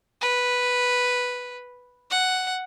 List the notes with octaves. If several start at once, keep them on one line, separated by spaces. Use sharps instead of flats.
B4
F#5